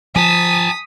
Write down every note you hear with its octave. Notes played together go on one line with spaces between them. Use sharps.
F3 G#5 A5 D#6 B6